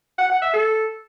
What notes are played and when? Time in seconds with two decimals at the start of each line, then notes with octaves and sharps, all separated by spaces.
0.18 F#5
0.30 F#5
0.42 E5
0.53 A4